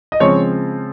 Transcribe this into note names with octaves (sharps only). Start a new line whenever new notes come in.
D#5
C#3 F3 G#3 C4 C#5